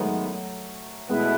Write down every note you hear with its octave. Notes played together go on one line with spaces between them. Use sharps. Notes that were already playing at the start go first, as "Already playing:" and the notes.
Already playing: G#2 D#3 F#3 G#3 A3 B3 D#4
B2 G#3 A3 B3 E4 B4 E5